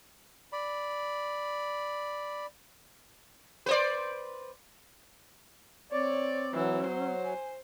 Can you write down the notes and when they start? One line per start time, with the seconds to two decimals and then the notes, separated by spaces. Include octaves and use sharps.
0.52 D5 B5
3.66 B4 C5 D5
5.92 C4 C#5 D5
6.54 E3 F#3
6.87 C5
7.24 G#5